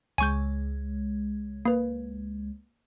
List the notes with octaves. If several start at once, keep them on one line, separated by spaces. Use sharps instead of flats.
C#2 G#3 G#5 C#6 G6
A#3 B4